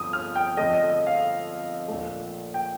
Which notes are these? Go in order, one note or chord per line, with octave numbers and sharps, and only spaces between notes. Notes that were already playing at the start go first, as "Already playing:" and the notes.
Already playing: G1 F2 D#6
F6
G5
F2 D3 A3 D#5
D#5
D#5
F5
A#1 A#2 A3
G5